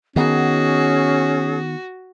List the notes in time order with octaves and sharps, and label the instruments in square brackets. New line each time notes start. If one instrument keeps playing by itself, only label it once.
[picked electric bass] D#3 B3 [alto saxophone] C#4 [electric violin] F#4 [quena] G#4